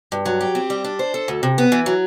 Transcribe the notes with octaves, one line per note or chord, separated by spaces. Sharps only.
G2
F#3
G4
C4
G3
D4
C5
A4
D2
C3
B3
E3
F#3